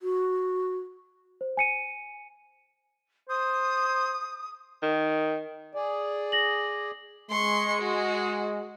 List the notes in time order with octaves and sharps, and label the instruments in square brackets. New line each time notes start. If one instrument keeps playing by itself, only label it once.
[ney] F#4
[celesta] C5
G#5 C#7 D#7
[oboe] C5 [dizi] D#6
[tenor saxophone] D#3
[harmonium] G#4 D5
[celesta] A#6 F#7
[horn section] G#3 [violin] C6 C#6
[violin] F#4